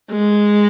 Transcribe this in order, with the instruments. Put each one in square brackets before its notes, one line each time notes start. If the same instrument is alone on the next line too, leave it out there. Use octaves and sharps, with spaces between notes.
[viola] G#3